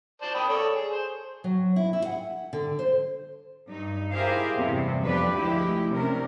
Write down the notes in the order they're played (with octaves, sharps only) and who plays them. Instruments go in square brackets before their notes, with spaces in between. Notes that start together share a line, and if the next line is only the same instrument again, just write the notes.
[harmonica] C5 D5 A5
G5 B5 D#6
A4 C#5 D5
G#4
C5
[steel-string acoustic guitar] F#3
E4
E4
F#5
D3
C5
[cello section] G2 D#4
E4 G4 G#4 A#4 C5 F5
E2 G2 C3 C4
F2 B3 D4 G4 B4
D2 F3 G#3 E4 G4
C3 C#4 D4 A#4